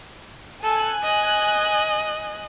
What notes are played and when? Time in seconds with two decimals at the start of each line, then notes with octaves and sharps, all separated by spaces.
0.63 A4 G#5 F#6
1.02 D#5